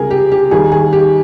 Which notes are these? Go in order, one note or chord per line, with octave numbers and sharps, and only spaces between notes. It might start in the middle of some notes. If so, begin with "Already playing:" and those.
Already playing: C#2 C3 G3 G#4 A#4
G4
G4
D#2 D#3 G3 G#4
G#4
G4